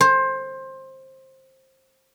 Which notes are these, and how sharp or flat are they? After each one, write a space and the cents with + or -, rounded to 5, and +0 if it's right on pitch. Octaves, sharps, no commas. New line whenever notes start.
C5 +20